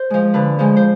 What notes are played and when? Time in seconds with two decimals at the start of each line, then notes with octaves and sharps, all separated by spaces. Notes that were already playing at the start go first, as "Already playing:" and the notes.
Already playing: C5
0.10 F3 G#3
0.34 D3 B4
0.59 F3 G#3
0.77 C5